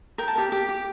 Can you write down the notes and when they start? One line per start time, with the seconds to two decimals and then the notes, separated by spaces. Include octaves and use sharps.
0.18 A#4 G5
0.28 A5
0.36 G4 A#4 G5
0.52 G4
0.69 G4